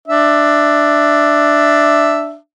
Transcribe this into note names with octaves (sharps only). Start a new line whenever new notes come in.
D4 E5